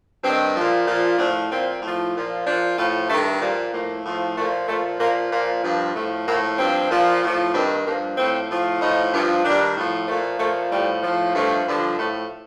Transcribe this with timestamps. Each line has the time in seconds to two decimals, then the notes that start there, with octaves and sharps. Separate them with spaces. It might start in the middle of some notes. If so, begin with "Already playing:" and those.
0.23 G2 D#3 C4
0.56 A#2 F3
0.87 A#2 F3
1.18 A2 F3 D4
1.50 A#2 F3 C4
1.82 A2 F3
2.14 A#2 F3
2.46 A#2 F3 D4
2.77 A2 F3 F4
3.09 G2 D#3 A3
3.41 A#2 F3 G3
3.73 A2 F3 A#3
4.05 A2 F3
4.36 A#2 F3 A3
4.68 A#2 F3 A3
5.00 A#2 F3 A#3
5.31 A#2 F3 A#3
5.63 G2 F3
5.95 A2 F3 A3
6.27 A2 F3 A#3
6.58 G2 F3 C4
6.90 A#2 F3
7.22 A2 F3
7.53 G2 D#3 C4
7.86 G2 F3 A#3
8.17 A2 F3 C4
8.49 A2 F3
8.80 A2 F3 D#4
9.13 G2 F3
9.44 G2 D#3 D4
9.76 A2 F3
10.08 A#2 F3 A3
10.39 A#2 F3 A3
10.71 A2 F3 G3
11.03 A2 F3
11.34 G2 F3 A3
11.66 G2 D3 F3
11.98 A2 F3 A3